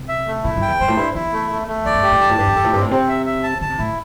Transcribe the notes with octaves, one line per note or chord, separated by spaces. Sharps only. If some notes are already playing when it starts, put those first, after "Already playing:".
Already playing: C3
E5
A3
C3 E4
G2
G5
E2
G2 C5
A2
G2 E4
E2 E4
A3
A3
A3
E2 D5
G2
G4
A2
G2 A5
A2
G2 G4
E2
G2 A4
A2
G2 C4
A2
C3 C4
E5
E5
A5
D3 A5
C3
A2 E4